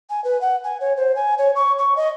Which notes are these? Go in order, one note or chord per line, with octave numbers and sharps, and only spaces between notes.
G#5
B4
F#5
G#5
C#5
C5
G#5
C#5
C#6
C#6
D#5